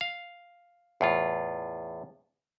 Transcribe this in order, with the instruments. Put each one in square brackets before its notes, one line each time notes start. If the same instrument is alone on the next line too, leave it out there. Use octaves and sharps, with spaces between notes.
[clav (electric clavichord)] F5
E2 A2 F4